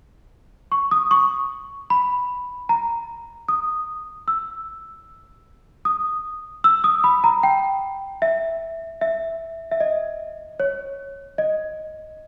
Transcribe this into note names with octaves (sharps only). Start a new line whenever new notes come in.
C#6
D#6
C#6
B5
A#5
D#6
E6
D#6
E6
D#6
B5
A#5
G5
E5
E5
E5
D#5
C#5
D#5